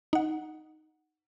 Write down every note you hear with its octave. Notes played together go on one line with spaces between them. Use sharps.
D#4 F#5